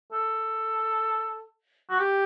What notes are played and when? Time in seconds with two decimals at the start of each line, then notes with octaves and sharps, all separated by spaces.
0.12 A4
1.90 F#4
2.00 G4